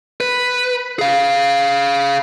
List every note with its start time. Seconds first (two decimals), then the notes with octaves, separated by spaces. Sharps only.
0.20 B4
0.99 G#4 F5